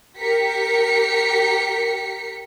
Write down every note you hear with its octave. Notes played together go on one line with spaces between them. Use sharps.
G4 A#4 B6 C#7